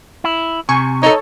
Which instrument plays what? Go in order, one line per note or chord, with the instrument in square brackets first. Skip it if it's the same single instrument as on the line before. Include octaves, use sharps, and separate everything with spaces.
[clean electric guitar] E4
[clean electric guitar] C3 [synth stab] G#5 C#6
[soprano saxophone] D#4 [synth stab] A4 C#5